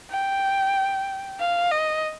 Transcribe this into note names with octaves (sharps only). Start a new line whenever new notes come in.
G5
F5
D#5